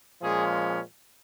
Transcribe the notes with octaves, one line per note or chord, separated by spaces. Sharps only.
A#2 F3 G#3 C#4 G#4